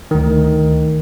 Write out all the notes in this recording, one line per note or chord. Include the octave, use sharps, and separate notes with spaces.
D2 D#3